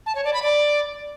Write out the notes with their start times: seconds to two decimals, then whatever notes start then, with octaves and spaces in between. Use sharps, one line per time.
0.06 A5
0.15 C#5
0.24 D5
0.33 B5
0.43 D5